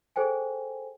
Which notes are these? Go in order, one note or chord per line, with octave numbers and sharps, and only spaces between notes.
G#4 A4 C5 G5 G#5